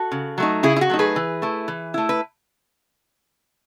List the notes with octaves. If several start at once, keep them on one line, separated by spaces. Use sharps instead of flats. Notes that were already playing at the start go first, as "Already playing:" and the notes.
Already playing: F#4 A4
C#3
F#3 A3 D#4
C#3 E4 G#4
E4
F#4
F#3 A3 D#4
G#4 B4
E3
A3 E4
E3
A3 E4
B4